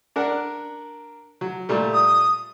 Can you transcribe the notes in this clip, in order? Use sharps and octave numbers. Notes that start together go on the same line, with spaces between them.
D4 A#4 F#5
F#3
A#2 G3 A3
D#6